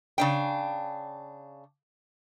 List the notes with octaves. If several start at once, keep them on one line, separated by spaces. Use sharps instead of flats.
C#3 D4 G5